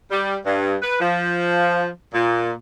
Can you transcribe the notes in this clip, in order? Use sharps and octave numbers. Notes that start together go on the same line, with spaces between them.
G3
G2
B4
F3
A#2